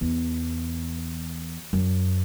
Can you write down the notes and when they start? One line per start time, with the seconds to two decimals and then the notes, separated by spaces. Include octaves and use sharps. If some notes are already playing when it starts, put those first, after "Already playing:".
0.01 E2
1.73 F#2